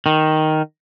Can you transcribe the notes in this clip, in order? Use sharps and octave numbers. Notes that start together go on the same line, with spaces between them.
D#3